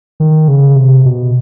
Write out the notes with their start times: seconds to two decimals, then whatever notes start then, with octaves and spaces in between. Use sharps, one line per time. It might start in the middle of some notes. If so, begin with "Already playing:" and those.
0.20 D#3
0.48 C#3
0.76 C3
1.05 B2